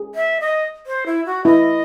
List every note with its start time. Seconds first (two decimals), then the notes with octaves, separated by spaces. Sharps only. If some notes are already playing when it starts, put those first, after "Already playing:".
Already playing: G#4
0.15 E5
0.41 D#5
0.87 C5
1.06 E4
1.26 F#4
1.45 E4 D#5